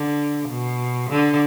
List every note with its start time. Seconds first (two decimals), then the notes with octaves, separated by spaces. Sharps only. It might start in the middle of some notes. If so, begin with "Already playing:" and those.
Already playing: D3
0.49 B2
1.09 D3